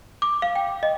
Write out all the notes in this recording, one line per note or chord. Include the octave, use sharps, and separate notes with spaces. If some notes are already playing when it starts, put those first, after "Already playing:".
D6
F5
G5
D#5